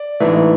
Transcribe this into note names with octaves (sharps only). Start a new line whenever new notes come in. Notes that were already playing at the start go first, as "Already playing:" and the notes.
Already playing: D5
A1 G#2 E3 A3